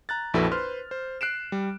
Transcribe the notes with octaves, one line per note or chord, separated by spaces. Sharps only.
A#5 F#6 A6
A#1 F2 E4 F#4 A4 B4
B4 C5 C6 F6
C5
F#6 C7 D7 E7
G3